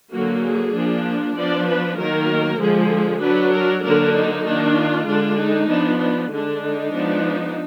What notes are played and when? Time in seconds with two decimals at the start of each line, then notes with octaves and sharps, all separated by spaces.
0.12 D3 F#3 A#3 F#4
0.43 G#4
0.74 F3 A#3 D4
1.36 F3 B3 D4 D5
1.67 B4
1.98 D#3 F#3 A#3 A#4
2.59 D3 F3 G#3 G#4
3.22 F#3 D4 B4
3.53 A#4
3.84 D3 F#3 A#3 D4 A#4
4.15 D#4
4.46 D#3 A#3 D4
4.76 F4
5.08 D3 G#3 D4
5.39 D#4
5.69 F3 B3 D4
6.01 D4
6.31 D3 G#3 D4
6.62 D#4
6.93 F3 G#3 B3 D4